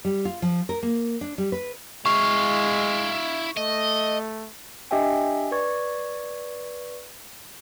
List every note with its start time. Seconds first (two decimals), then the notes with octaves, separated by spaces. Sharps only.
0.05 G3
0.25 F4
0.42 F3
0.69 A#4
0.83 A#3
1.21 D4
1.38 G3
1.52 B4
2.06 G#3 E4 F5 C#6
3.57 A3 D#5
4.91 D4 G4 D#5 E5 G5 G#5
5.51 B4 D5 C#6 G#6